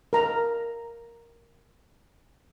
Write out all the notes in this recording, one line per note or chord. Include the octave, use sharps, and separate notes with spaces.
A#4 A#5